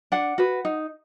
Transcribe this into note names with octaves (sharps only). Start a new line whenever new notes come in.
D4 F#5
F#4 B4
D#4